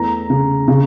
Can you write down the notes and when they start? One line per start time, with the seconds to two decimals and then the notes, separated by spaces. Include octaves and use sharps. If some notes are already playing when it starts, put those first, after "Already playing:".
Already playing: E2 A3 A#5
0.30 C#3
0.68 C#3